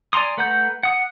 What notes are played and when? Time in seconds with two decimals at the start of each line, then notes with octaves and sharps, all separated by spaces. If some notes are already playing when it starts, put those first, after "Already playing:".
0.13 D5 G#5 A#5 C6 D#6
0.37 A3 B4 F#5 A#5 G6
0.83 F#5 D#6